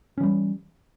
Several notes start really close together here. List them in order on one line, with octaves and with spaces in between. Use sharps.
C#4 E3 G3